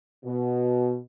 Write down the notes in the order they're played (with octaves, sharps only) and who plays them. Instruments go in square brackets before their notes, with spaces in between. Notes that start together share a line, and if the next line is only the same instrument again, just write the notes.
[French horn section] B2